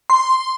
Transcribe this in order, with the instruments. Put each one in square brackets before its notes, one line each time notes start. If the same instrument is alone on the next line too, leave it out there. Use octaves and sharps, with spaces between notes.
[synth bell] C6